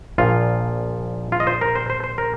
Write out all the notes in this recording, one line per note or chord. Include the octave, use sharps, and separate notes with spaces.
A#1 A#2 F3 F4
F4
D#5
C5
A#4
C5
C5
C5
A#4